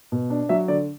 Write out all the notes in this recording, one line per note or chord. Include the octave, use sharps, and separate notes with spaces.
B2
D4
F#3 E5
D3 D5